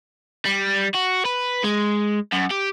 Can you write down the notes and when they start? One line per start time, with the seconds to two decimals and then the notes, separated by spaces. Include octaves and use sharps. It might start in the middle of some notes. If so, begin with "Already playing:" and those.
0.45 G3
0.95 F#4
1.25 B4
1.64 G#3
2.32 F#2
2.51 G4